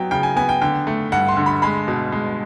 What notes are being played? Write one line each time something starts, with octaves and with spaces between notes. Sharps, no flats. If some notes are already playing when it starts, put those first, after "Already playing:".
Already playing: F#3 B3 G5
C#3 G5
G#5
B3 G#5
G5
D3 G5
A3
G2 F#5
C6
D3
B5
G#3 B5
B2
G#3